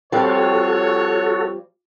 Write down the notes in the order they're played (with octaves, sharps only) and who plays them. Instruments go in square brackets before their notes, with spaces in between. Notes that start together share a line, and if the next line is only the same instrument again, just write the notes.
[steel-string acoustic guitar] F3 G3 C4 [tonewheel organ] F#4 A4 [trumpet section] C#5